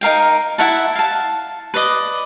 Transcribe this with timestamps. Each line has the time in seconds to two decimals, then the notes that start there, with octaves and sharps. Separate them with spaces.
0.01 D#4 A#4 F5 G5
0.58 E4 E5 F#5 A5
0.95 F5 A5
1.74 B4 D5 D#5